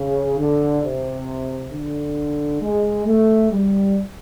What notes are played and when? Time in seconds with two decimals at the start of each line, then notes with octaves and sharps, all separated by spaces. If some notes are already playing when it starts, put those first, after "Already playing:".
Already playing: C#3
0.38 D3
0.84 C3
1.72 D3
2.62 G#3
3.06 A3
3.51 G3